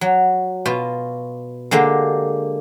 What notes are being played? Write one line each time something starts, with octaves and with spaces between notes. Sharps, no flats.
F#3
B2 F4
D3 G#3 A#3 G4